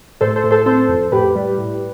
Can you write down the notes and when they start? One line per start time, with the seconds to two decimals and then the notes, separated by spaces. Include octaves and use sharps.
0.21 A2 A4 C5
0.36 A4 C5
0.44 A2
0.51 A4 C5
0.66 C4 A4 C5
0.89 F2
1.12 A2 G4 B4
1.36 G3
1.58 A2